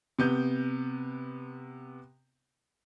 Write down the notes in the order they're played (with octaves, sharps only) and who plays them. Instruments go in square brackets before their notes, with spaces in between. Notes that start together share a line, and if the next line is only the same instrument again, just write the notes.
[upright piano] C3 B3 G6